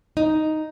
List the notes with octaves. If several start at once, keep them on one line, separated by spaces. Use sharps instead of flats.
D#4